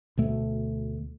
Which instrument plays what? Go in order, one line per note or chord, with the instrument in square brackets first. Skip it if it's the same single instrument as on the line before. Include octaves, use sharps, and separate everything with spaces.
[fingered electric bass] D2 B2 A3